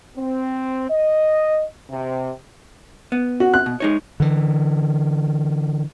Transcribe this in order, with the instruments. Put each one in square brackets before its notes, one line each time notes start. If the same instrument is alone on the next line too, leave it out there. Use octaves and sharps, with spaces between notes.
[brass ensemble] C4
D#5
C3
[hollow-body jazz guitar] B3
[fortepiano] F#4
F#6
[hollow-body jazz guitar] B2
G#3 D#4 C#5
[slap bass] D3 E3